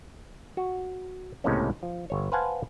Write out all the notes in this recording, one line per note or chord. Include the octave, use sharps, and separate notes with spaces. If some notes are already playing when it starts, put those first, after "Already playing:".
F#4
C#2 A2 C3 G#3 A#3 C#4
F3
G1 C#5
B4 C5 F5 F#5 G#5 A5